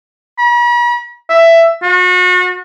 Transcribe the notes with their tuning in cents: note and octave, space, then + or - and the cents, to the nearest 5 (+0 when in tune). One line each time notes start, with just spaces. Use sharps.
B5 -45
E5 +10
F#4 -35